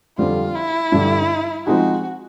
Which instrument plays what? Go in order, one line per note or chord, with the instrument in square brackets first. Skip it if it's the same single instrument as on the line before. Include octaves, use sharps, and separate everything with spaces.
[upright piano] F2 D3 G3 C4 [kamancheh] F4
[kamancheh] E4
[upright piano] G2 D3 G3
[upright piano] F3 G#3 C4 D#4 G#4 [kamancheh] F#4